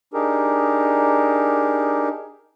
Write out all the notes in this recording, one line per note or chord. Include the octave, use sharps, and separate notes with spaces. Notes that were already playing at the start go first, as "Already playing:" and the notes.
D4 D#4 G4 G#4 A#4